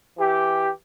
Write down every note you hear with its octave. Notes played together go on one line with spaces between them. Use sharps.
E3 G4